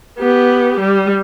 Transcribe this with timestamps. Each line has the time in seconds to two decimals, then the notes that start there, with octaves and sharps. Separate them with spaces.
0.18 B3 G4
0.80 G3